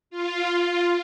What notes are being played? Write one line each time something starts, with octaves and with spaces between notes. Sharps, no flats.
F4
F4